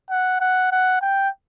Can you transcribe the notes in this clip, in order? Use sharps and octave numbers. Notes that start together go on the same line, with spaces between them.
F#5
F#5
F#5
G5